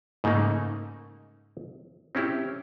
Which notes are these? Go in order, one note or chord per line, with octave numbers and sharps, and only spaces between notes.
G#2 C#3 A3 A#3 D#4
C4 C#4 E4 G4